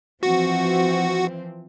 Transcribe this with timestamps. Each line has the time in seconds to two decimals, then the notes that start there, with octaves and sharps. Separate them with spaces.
0.23 E3 F3 C4 F#4